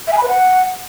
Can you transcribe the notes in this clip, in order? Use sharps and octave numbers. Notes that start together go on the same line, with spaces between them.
E5
G#5
B5
B4
F#5